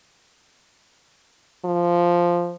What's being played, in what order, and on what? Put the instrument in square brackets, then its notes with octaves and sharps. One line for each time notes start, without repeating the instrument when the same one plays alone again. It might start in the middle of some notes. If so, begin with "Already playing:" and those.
[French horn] F3